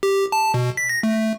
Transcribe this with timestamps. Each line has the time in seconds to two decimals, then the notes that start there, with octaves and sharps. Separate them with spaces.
0.03 G4
0.32 A5
0.54 B2
0.77 B6
0.89 A#6
1.03 A3